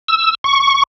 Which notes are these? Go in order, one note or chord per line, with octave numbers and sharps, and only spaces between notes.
E6
C#6